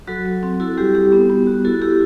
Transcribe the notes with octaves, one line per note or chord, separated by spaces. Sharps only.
F#3 F#4 A4
F#3
C4
E4 F#4 A4
G3 G4
G3 G4
B3
B3
F#4
E4 F#4 A4
E4 G4